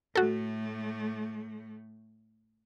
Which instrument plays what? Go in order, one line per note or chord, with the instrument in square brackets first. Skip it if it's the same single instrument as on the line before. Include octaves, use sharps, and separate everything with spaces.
[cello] A2 A3 [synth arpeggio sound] F#4 A4